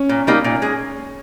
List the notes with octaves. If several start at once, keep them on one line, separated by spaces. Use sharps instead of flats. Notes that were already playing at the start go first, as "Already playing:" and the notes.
Already playing: C#4
A#2
G3 A#3 D#4 G4
A#2
G#3 G#4